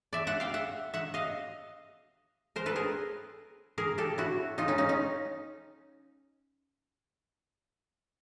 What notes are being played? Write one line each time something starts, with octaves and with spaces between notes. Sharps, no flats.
D5 E5
E5 F#5
F5 G5
E5 F#5
E5 F#5
D#5 F5
A#4 C5
A4 B4
G#4 A#4
G#4 A#4
G4 A4
E4 F#4
D#4 F4
C#4 D#4
C#4 D#4
C#4 D#4